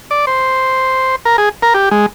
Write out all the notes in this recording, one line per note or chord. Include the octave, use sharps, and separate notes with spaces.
D5
C5
A#4
G#4
A#4
G4
G#3